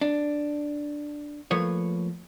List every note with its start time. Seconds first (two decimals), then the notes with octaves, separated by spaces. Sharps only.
0.01 D4
1.51 F3 A3 A#3 B4 C#5